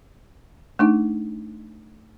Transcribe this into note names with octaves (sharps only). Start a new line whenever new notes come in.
A3 D4 D#4